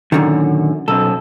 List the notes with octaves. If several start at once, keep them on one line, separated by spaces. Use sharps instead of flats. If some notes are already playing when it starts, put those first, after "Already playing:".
F#2 A#2 D3 D#3
B1 F#2 A4